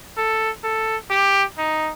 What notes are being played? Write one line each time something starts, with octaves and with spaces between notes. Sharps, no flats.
A4
A4
G4
D#4